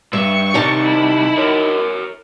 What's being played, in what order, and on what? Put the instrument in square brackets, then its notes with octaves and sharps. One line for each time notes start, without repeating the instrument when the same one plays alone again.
[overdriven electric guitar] G2 [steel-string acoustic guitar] E5 [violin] C#6 C#7
[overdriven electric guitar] C3 G3 [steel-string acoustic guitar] D#3 D#4 A5
[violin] E4
[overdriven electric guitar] A#4 C#5